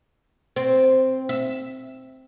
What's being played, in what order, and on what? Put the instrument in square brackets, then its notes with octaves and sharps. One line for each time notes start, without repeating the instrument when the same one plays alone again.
[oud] C4
E5